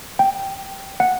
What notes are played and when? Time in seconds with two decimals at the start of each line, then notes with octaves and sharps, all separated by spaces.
0.19 G5
1.00 F#5